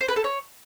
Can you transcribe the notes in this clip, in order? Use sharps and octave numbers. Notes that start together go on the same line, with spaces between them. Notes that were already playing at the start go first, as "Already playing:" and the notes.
C5
B4
A4
C#5